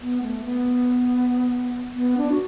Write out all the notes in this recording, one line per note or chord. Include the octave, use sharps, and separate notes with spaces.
B3
A3
B3
B3
D4
F#4